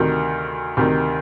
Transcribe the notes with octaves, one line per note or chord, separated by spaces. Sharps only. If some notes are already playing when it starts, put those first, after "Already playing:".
Already playing: D2 C3 D#3
D2 C3 D#3